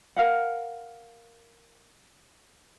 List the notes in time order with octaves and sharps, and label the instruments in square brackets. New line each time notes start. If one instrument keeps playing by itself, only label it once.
[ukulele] A#4 F5 F#5